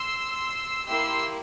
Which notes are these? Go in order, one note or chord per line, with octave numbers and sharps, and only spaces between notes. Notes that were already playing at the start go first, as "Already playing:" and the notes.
Already playing: C6 E6
A#3 E4 G4 C6 E6